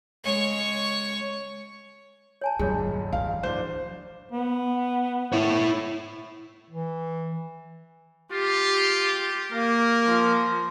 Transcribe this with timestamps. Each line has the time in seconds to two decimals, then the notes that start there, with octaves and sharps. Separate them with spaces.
0.24 C#3 G#3 C#5 C#6
2.41 C#5 G#5 A5
2.59 D#1 C#2 G2 F#3 G#4 C#5
3.12 E3 G#3 F5
3.43 D1 D4 C5
4.32 B3
5.33 E4 C#5
6.70 E3
8.32 F4 G4
9.52 A#3 A#4
10.05 F3